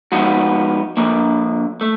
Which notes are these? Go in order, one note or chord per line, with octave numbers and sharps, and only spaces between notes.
F3 G#3 B3 D#4 F#4
D3 F3 A#3
A3